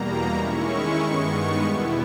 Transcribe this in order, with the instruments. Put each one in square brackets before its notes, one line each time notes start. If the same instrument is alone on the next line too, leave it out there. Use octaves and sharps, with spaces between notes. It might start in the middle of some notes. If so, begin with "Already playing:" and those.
Already playing: [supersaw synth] E2 B2 G3 A#3 A#5
D#3 G#3 C#4 E4 C#6
G2 D#3 G#3 B3
E2 B2 G3 B3 E4